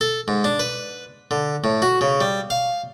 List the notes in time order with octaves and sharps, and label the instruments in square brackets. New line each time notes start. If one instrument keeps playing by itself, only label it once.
[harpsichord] A4
G#2
D4
B4
D3
A2
F#4
C#3
G3
F5